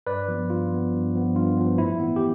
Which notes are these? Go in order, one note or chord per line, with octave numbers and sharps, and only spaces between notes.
G2 B4 D5
F3 B3
G2 F4
F3 B3
G2
F3 B3
G2 F4
F3 B3
A2 E4
E3 B3
G4